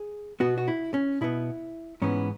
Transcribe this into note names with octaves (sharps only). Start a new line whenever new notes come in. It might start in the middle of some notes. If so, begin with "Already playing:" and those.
Already playing: G#4
B2 B3 F#4
F#4
E4
C#4
B2 B3 E4
G#2 E3 B3 C#4